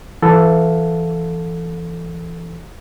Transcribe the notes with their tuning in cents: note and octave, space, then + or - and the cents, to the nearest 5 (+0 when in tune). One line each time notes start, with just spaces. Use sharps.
E3 +25 A4 +0 F5 +35